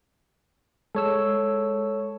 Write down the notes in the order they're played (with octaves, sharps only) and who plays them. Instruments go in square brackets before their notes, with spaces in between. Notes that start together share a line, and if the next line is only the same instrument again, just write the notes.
[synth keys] G#3 [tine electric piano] A4 C#5 E6